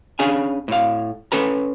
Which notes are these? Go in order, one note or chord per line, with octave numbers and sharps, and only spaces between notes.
C#4 D4 G#4 F5 G#5
A2 F5
C#4 A4 B4 A#5